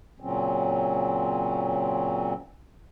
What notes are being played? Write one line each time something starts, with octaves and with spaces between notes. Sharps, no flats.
A#2 C#3 F#3 C4 C#4